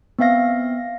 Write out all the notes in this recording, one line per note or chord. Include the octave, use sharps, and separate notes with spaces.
B3 C4 E5 F5 A#6